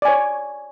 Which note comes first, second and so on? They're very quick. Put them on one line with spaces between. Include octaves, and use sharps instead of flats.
D5 G#5 C#5